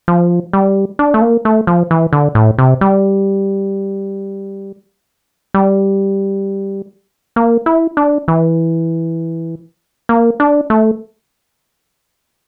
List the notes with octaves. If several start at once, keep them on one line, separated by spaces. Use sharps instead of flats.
F3
G3
D4
A3
A#3
A3
F3
E3
D3
A2
C3
G3
G3
A#3
E4
D4
E3
A#3
D4
A3